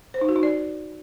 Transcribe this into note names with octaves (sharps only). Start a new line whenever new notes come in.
C5
D#4
F#4
D#4
D5